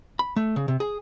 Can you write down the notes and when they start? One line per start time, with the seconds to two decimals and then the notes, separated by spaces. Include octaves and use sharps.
0.19 B5
0.36 A3
0.56 C#3
0.68 C3
0.80 G#4